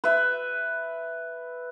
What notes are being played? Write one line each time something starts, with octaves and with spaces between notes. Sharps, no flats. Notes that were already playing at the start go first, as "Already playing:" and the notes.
B4 E5